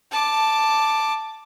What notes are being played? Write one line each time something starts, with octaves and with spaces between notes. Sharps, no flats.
A5 D6